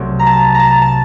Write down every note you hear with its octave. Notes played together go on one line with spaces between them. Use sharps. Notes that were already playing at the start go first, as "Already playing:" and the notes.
Already playing: C2 C3 F#3 A3 C4
A#5
A5
A#5
A5
A5